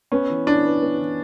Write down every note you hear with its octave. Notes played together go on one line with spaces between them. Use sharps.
B3 C#4
E3
D4 E4
B4
B3
E3